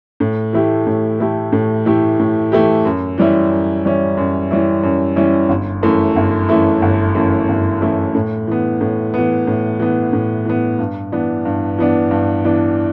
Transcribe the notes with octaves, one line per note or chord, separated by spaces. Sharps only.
A2
E3 A3 E4 G4
A2
E3 A3 E4 G4
A2
E3 A3 E4 G4
A2
E3 A3 E4 G4
F#2
E3 G3 C#4 E4
F#2
E3 G3 C#4 E4
F#2
E3 G3 C#4 E4
F#2
E3 G3 C#4 E4
G1
F#2 E3 A3 E4
G1
F#2 E3 A3 E4
G1
F#2 E3 A3 E4
G1
F#2 E3 A3 E4
A2
E3 B3
A2
E3 B3
A2
E3 B3
A2
E3 B3
G2
E3 B3 D4
G2
E3 B3 D4
G2
E3 B3 D4